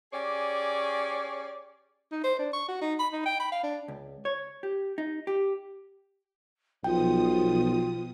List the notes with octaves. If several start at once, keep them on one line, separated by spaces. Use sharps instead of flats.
C#4 G4 G#4 C#5 D5
D#4
C5
D4
C#6
F#4
D#4
B5
D#4
G5
B5
F5
D4
C#2
C#5
G4
D#4
G4
B1 B2 F3 F4 G5 D#6